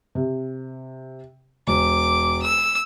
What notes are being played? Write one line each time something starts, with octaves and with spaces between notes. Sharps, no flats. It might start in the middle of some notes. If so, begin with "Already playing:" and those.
C3
E1 D6
E6